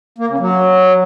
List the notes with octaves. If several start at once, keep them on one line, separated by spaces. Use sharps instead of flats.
A#3
C#3
F#3